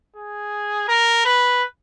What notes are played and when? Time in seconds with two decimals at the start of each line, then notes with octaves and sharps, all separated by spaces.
0.16 G#4
0.88 A#4
1.25 B4